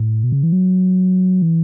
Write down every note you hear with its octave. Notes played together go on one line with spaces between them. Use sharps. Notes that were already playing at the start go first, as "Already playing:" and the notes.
Already playing: A2
B2
C#3
E3
F#3
E3